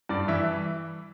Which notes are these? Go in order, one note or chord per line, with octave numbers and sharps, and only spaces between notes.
G2 D5
E3 E5